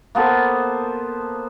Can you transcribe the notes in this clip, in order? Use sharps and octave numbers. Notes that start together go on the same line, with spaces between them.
A#3 B3 A4 C5